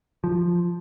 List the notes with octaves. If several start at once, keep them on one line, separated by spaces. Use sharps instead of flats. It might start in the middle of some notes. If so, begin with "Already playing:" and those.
F3